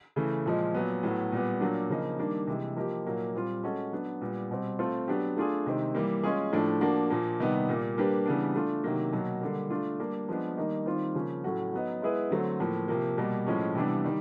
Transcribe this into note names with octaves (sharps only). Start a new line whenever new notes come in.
C#3 E3 A3
A#2 F3 G#3
A#2 F#3 B3
A2 F#3 B3
A#2 G3 B3
A#2 F#3 A#3 D4
C#3 F3 A#3 D#4
D#3 G3 A#3 D4
C3 E3 G#3
F3 A#3 D#4 G4
A#2 F#3 A#3 D#4
A#2 G3 C4 F4
G#3 C#4 F#4 A4
F#3 B3 D4
A#2 G3 B3
B2 G3 C4
A3 C4 F4 A4
F#3 B3 D4 G4
A3 D4 F4 G#4
C3 D#3 G#3 C4
E3 G3 A#3
G#3 C#4 F4 G#4
A2 F3 A3 D4
F3 A#3 D4 F#4
A#2 F3 A#3
C3 D#3 G3 B3 D#4
A#2 G3 A#3
G3 A#3 D4 G4 B4
C#3 E3 G3 B3 D4
A3 D4 F4
C3 D#3 F#3 A#3
B2 F#3 A#3
D3 G3 A#3
A3 D4 F4
G3 A#3 D4
F3 G#3 B3 D4
D#3 G3 A#3 D#4
D#3 G3 C4 F4
C#3 F3 A#3 C#4
A2 F#3 A3 C#4 F#4
F#3 B3 D#4
G#3 B3 E4 G#4 B4
D3 F#3 A3 C4
A2 F3 A#3
C3 F3 A#3
B2 G3 A#3
A2 F3 G#3 C#4
C3 E3 G3 B3 D4
D#3 G3